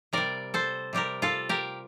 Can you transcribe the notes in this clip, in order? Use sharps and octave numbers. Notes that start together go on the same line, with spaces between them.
C3 G3 A#4 D5
A4 C5
C3 G3 G4 A#4
F4 A4
G4 A#4